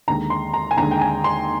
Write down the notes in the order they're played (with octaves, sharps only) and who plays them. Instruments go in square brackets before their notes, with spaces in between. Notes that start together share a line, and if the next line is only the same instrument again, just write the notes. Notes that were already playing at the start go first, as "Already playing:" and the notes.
[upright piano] D#2 D3 G#3 A#5
C6
A#5
G#5
D#2 D3 G#3 A#5
G5
G#5
C6